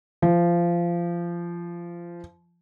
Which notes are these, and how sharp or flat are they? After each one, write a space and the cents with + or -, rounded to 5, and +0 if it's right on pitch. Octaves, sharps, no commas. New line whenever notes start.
F3 -20